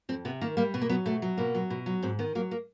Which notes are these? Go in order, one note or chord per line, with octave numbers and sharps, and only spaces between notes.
F2 C4
C3 B3
D#3 A#3
G3 A#3
B2 B3
A#3
F#3 B3
B2 A3
F#3
B2 A#3
F#3
B2
F#3
G#2 C4
D#3 B3
F#3 A#3
A#3